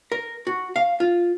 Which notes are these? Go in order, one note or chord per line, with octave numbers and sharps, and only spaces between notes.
A#4
F#4
F5
F4